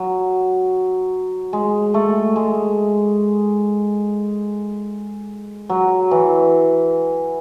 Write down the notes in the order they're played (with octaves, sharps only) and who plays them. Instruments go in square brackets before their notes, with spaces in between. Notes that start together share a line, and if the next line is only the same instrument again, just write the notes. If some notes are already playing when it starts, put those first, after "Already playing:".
Already playing: [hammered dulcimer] F#3
G#3
A3
G#3
F#3
E3